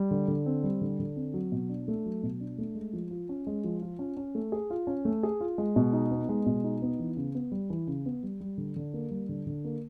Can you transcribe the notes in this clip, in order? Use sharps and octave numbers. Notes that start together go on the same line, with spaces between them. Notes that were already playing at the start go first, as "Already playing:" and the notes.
Already playing: G3
D3
D3
C4
G3
D3
D3
C4
F#3
B2
D4
A3
F#3
B2
D4
A3
G#3
F3
F4
C#4
G#3
F3
F4
C#4
C#4
A3
G#4
F4
C#4
A3
G#4
F4
G#3
B2
D#4
B3
G#3
B2
D#4
B3
E3
C#3
B3
G3
E3
C#3
B3
G3
G3
D3
D3
A#3
G3
D3
D3
A#3